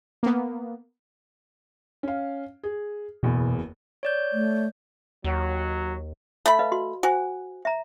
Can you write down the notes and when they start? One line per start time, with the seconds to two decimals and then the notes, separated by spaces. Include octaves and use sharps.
0.23 A#3 B3
2.03 C#4 F5
2.63 G#4
3.23 F#1 E2 B2 B3
4.03 C#5 D5 G6
4.33 A3
5.24 D#2 F#3
6.46 A3 B5
6.59 B4 D#5 F5
6.72 F#4 C6
7.03 F#4 C5 G#5
7.65 E5 A#5